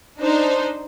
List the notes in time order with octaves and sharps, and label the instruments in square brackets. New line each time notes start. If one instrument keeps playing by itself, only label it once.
[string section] D4 D#4 C5